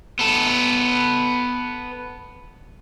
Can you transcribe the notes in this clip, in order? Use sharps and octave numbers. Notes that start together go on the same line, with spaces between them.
B3 A4